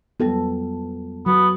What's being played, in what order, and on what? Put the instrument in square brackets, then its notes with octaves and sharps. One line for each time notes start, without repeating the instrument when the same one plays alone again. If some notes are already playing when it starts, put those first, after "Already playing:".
[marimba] F2 F#3 G3 [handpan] B3 A4
[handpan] F#3 [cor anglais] B3